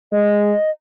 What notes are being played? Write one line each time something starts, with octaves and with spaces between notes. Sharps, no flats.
G#3 D#5